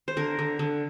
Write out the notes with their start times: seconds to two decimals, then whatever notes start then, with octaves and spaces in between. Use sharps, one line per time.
0.08 C5
0.17 D3 A#4
0.39 D3
0.59 D3